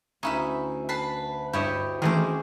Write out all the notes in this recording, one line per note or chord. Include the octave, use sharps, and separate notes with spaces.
D2 C#4 D#4 E4 E5
B4 A5 B6 C7
G2 E4 G4 C#5 D#5
D#3 E3 G#3 A3 C4 C#4 G#4 D6